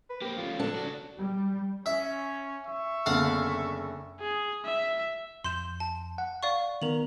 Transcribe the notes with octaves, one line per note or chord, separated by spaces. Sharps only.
B4
A#3 C4 G4
F3 A3 C#4 F4
D4 A4
C#3 F#3 F#4
G3
C#4 E5
E5 C#6
F#1 D3 B3 F5 F#5
G#4
E5
F2 C6 G6 E7
A5
F#5
D5 F5 C#6
D#3 B3 A#4 F7 F#7